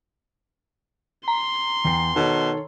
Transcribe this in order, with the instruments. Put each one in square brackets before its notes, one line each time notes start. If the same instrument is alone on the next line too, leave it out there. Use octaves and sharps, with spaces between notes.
[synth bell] A#5 [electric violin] C6
[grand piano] E2 G5 C7
[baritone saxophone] B2 [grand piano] D#3 A4 C#5